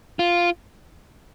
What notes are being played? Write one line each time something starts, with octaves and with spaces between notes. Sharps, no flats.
F4